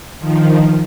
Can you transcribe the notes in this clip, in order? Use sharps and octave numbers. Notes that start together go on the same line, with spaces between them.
D#3 F3